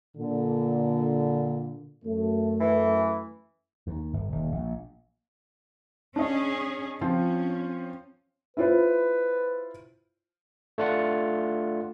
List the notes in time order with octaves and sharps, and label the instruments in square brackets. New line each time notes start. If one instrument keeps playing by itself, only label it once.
[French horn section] A#2 D3
[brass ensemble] F#2 A3
[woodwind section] E3
[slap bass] D#2
G1
D#1
A#1
[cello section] C#4 G#4 [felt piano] D4 D#5
[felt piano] F3 C4 F4 [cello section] C#4
[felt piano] E4 F4 C5 [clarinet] B4
[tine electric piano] A3 D4 F4 F#5